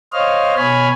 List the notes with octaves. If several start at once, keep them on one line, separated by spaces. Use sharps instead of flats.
C5 C#5 D#5 F5 F6
B2 C#5 G#5 B5 F6